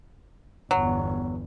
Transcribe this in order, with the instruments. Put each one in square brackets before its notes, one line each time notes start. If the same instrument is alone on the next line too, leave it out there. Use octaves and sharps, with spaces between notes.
[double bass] G1 E2 [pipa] F#3